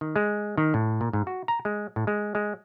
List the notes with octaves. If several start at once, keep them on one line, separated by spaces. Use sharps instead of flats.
D#3
G#3
D#3
A2
A#2
G#2
F#4
A#5
G#3
A2
G#3
G#3